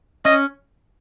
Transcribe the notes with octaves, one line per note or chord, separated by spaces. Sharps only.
C#4 D#5